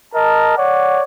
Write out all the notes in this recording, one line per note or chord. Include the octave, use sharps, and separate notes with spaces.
A#4 D#5 A5
C#5 D5 F#5